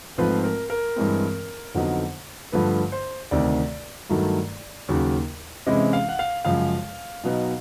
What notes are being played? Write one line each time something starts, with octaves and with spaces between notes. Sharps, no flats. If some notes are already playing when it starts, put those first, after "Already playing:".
G#2 F3 A3 C4 F4 B4
A#4
A#4
G2 E3 G#3 C4
F2 D3 F#3 B3 D#4
G2 D3 F3 A3 B4
C5
D2 C3 D#3 D5
G2 D#3 F#3 A3
D#2 C#3 F#3
C3 E3 G#3 C#4 E4 D#5
F5
F#5
F5
F#2 C#3 F3 G#3 F5
B2 F#3 B3 D#4